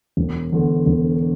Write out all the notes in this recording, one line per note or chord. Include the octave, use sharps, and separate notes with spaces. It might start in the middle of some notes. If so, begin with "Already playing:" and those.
E1
E2 D3
E1